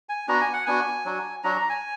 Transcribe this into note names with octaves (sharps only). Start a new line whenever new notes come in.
G#5
B3 D4 F#4 A#5
G#5
F#5
B3 D4 F#4 G#5
F#3 D4 F#4
F#3 D4 F#4 A#5
A#5
G#5